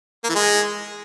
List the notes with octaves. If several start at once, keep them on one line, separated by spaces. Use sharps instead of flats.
A#3
E3
G#3